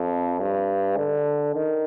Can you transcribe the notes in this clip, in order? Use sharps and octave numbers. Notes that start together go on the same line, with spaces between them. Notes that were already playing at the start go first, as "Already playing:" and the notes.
Already playing: F2
G2
D3
D#3